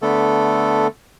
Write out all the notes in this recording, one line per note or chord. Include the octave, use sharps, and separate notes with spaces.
D3 A3 B3 A4